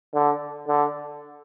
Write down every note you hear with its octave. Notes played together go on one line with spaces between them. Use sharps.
D3
D3